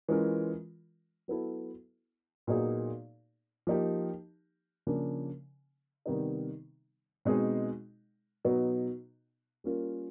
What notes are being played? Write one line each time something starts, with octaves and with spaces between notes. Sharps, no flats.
E3 G#3 C#4 F4 A#4
F#3 B3 E4 A4
A#2 F#3 B3 D#4 G#4
F3 A#3 D#4 G4
C#3 F3 A#3 D4
C3 D#3 G3 B3 D#4
B2 G#3 C4 D#4 G#4
B2 F#3 B3 D#4
G3 A#3 C#4 F4 A#4